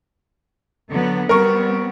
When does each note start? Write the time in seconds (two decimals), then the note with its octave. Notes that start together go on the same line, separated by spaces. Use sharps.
0.89 D3 F#3 B3
1.29 G3 B3 C4 A#4 C#6